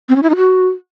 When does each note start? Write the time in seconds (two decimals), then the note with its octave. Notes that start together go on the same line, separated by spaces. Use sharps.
0.09 C4
0.16 C#4
0.23 E4
0.30 D#4
0.36 F#4